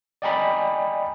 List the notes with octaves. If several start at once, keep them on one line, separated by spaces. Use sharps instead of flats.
D5 D#5 G5 G#5 A#5 B5